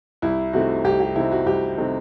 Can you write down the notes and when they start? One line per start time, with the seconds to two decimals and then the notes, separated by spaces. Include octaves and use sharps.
0.22 C2 E4
0.53 C3 D#3 A3 C4 F#4
0.84 C2 G4
1.00 G4
1.15 C3 D#3 A3 C4 E4
1.31 F#4
1.46 C2 G4
1.78 C3 D#3 A3 C4